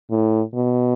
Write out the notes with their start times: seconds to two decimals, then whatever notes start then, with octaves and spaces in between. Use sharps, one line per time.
0.11 A2
0.54 B2